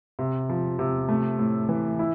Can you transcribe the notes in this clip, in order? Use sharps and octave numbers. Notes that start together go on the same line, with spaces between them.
C3
F3
C3
A3
A2
E3
E4